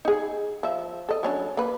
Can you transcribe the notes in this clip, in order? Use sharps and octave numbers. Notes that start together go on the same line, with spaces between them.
D#4 G#4
F3 E5
A4 D#5
F#3 C#4 D4
A#3 B4